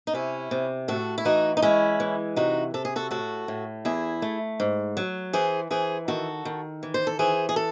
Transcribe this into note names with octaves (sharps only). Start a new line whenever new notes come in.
D#4
C3 C#4 E4
C3
A2 F#4 A4
E4
E3 D#4 F#4
D#4
G#3 C#4 E4
E3
C3 D#4 F#4
C3 A4
G#4
F#4 A4
A2 F#4 A4
A2
E2 E4 G#4
A3
G#2
F#3
E3 G#4 C5
E3 G#4 C5
D#3 F#4 A4
D#3
E3
C5
A4
E3 G#4 C5
G#4
A4